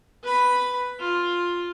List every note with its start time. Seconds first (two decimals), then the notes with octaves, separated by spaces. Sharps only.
0.24 B4 B5
1.00 F4